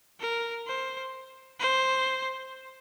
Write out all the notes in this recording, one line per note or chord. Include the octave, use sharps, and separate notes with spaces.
A#4
C5
C5